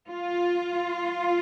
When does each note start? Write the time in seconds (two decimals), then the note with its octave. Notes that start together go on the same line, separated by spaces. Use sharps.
0.10 F4